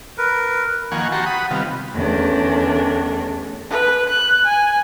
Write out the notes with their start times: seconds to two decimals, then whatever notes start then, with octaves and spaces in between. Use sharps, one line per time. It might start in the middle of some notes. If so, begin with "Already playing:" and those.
0.18 A#4 B4
0.92 D#3 F3 A#3 F#5 G#5 C#6
1.12 F#4 G4 A5 A#5 C6 C#6
1.26 F#5 B5 D#6
1.51 C3 D#3 G3 B3 F4
1.94 E2 D#3 A3 C#4 D4
3.70 B4
4.09 F#6
4.45 G#5